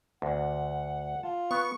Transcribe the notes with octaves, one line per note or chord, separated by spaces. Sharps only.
D2 F#5
F4 A5
B3 C#6